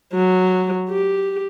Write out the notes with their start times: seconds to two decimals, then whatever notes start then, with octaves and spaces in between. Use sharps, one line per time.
0.13 F#3
0.89 G4